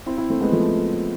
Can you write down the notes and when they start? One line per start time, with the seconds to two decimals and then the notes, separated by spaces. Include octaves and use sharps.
0.06 C4 E4
0.18 C4 E4
0.30 A3 C4
0.41 G#3 B3
0.52 F3 A3